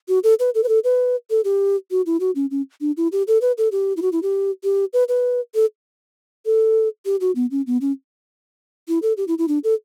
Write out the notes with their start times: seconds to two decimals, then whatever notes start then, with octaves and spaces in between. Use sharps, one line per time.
0.08 F#4
0.24 A4
0.40 B4
0.55 A4
0.63 B4
0.69 A4
0.84 B4
1.30 A4
1.44 G4
1.91 F#4
2.06 E4
2.20 F#4
2.35 C#4
2.51 C#4
2.81 D4
2.97 E4
3.12 G4
3.27 A4
3.41 B4
3.58 A4
3.72 G4
3.97 E4
4.02 F#4
4.12 E4
4.23 G4
4.64 G4
4.93 B4
5.09 B4
5.55 A4
6.46 A4
7.05 G4
7.21 F#4
7.35 B3
7.51 C#4
7.67 B3
7.81 C#4
8.88 E4
9.02 A4
9.17 G4
9.28 E4
9.38 E4
9.48 D4
9.64 A4